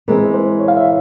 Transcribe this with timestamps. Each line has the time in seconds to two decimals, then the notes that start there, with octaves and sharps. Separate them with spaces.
0.08 E3 G#3 C4 A#4
0.34 C5
0.59 C#5
0.68 F5
0.77 E5